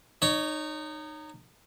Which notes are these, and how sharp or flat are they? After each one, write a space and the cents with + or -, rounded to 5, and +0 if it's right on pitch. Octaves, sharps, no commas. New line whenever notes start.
D#4 -25 C#5 +10